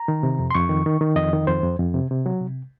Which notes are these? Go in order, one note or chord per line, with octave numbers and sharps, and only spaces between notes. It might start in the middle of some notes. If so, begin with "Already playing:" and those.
Already playing: A#5
D#3
C3
F2
C6
F2 C#6
D#3
D#3
D#3
F2 D#5
D#3
F2 C5
F2
F2
C3
C3
F#3
C3